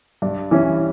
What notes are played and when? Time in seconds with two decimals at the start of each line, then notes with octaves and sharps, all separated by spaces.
0.22 G2 D5
0.51 E3 G3 C#4 E4